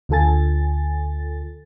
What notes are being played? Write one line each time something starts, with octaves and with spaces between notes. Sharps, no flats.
D2 D3 F4 A4 G#5 A6